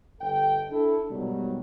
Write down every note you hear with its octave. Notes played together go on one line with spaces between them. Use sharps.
G1 A4 G5
D4 E4 A4
G#2 B2 D#3 F#3 G3